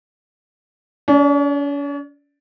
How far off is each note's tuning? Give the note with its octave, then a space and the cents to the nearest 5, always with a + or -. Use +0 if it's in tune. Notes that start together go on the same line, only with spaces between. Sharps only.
C#4 +45 D5 +0